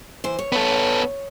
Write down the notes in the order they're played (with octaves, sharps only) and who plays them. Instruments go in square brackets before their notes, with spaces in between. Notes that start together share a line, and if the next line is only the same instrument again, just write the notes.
[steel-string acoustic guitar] E3 C5
C#5
[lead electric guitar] B3 A4